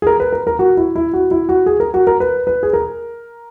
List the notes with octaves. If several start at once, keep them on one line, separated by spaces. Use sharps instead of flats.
G#4
A#4
B4
A#4
A#4
F#4
E4
E4
F#4
E4
F#4
G#4
A#4
F#4
A#4
B4
B4
G#4
A#4